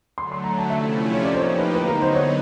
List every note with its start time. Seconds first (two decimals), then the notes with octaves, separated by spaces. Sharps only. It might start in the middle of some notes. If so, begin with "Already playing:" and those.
0.18 D3 F#3 A3 C6
0.32 C6
0.44 A#5
0.58 A5
0.70 C3 F3 A3 C#4 E4 E5
1.12 C#5
1.23 A2 F3 A#3 D#4 G4 D5
1.34 C5
1.40 C#5
1.58 B4
1.75 D3 F#3 B3 D#4 B4
1.88 A#4
2.02 C5
2.15 C#5